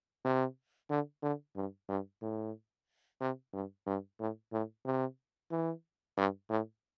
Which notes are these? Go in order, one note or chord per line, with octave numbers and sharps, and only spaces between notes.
C3
D3
D3
G2
G2
A2
C3
G2
G2
A2
A2
C3
E3
G2
A2